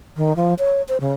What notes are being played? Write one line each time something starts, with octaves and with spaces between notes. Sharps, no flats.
D#3
F3
C#5
C5
C#3